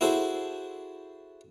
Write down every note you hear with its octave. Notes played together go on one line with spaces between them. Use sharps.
E4 F#4 G#4 A4 C5